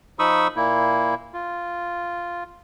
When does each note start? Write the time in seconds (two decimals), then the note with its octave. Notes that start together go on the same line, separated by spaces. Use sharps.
0.19 F3 D#4 B5 C#6 D#6 E6
0.56 A#2 A#3 E4
1.33 F4